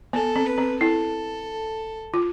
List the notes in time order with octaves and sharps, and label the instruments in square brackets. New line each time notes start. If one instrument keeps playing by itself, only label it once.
[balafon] B3 [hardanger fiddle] A4
[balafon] C4
[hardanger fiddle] B4
[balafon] C4
[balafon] E4 [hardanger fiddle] A4
[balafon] F4